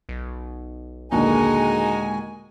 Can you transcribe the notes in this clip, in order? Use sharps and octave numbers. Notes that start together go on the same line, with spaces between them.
B1
D#2 A#2 D3 G#3 D#4 F#4 G#5